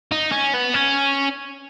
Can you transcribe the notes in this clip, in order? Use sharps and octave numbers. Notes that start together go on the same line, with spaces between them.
D#4
C#4
B3
C#4